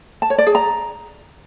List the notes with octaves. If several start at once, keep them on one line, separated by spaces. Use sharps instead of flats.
A5
C#5
D5
G#4
A#5